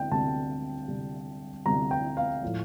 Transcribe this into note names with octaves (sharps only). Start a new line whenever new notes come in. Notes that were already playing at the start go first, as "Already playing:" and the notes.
Already playing: D2 C3 G5
D2 C3 G3 A5
D2 C3 G3
D2 C3 G3 A#5
G5
F5
A2 F3